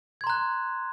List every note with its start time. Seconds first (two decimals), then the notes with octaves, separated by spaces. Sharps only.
0.21 G#6
0.24 C6
0.27 A#5
0.30 F#6